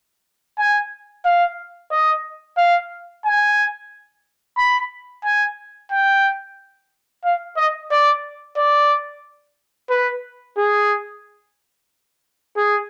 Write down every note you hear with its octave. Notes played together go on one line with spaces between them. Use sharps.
G#5
F5
D#5
F5
G#5
B5
G#5
G5
F5
D#5
D5
D5
B4
G#4
G#4